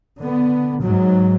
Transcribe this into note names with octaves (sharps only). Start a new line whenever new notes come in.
D3 B3
G#2 F#3